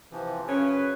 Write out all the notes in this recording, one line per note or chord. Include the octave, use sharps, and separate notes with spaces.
C3 E3 F3
F#2 C#3 C#4 B4